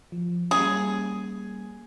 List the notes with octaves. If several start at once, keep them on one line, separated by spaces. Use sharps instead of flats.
F3
G3 A#3 C#4 G#4